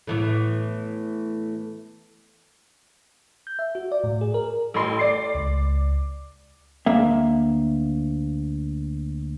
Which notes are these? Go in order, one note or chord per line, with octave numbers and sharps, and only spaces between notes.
A2 E3 B3
G6
E5
F#4
D5
A2
G#4
A#4
A1 A4 C6
D5 C7
C#2
D2 A#3 E5